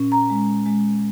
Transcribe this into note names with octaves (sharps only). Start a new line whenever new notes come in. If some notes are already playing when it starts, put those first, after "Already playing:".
Already playing: A#2 C#4
A#5
G#3
G#3